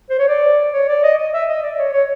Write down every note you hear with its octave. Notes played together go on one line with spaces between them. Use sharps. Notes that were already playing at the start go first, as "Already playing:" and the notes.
C5
C#5
D5
C#5
D5
D#5
D#5
E5
D#5
D5
C#5
C#5